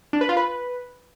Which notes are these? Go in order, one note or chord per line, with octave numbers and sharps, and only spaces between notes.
D4
B4
F4
B4